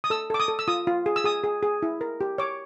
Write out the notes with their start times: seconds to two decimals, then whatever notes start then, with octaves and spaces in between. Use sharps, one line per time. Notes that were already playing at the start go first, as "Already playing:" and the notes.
0.04 D#6
0.10 A4 E6
0.30 A4 D6
0.40 D#6
0.48 A4
0.59 E6
0.68 F4 D#6
0.87 F4
1.06 G#4
1.16 E6
1.24 G#4 D#6
1.44 G#4
1.63 G#4
1.82 E4
2.01 A#4
2.21 G4
2.38 C#5 D6